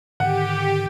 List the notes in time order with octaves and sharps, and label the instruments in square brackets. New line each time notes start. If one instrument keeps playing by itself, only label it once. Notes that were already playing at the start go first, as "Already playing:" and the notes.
[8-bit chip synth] G#2 D3 D#3 [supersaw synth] G4 [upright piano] F#5